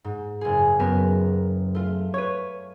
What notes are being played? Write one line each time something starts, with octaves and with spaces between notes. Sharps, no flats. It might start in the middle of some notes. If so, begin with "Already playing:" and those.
G#2
F#1 G#4
F#2 B3 A#4
A3 F4
B4 C#5